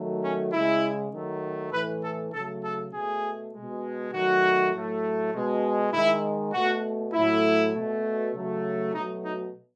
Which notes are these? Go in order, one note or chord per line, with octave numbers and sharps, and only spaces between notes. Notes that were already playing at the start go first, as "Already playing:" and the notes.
Already playing: D#3 F#3 A3
C#4
C#3 G#3 E4
D#3 F#3 A3
A2 E3 A3 B4
A4
C#3 F#3 A3 A4
A4
B2 A3 G#4
B2 G#3
D#3 F#3 A3 F#4
A2 F#3 A3
B2 G#3
D#3 G#3 E4
B2 A3 F#4
A2 F#3 A3 E4
B2 A3
C#3 F#3 A3
B2 F#3 A3 D#4
D#4